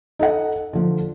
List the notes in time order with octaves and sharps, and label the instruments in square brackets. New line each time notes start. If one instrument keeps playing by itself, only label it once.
[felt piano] D#4 A4 D#5 F#5
D3 F3